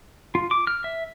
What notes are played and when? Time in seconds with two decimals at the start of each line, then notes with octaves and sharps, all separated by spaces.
0.35 F4
0.51 D6
0.67 F6
0.84 E5